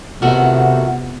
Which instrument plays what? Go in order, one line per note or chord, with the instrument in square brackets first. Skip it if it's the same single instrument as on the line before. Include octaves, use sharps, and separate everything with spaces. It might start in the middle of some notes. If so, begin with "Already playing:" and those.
[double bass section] C3 B3 [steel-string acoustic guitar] D#3 A3 F#4 [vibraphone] F4 F#5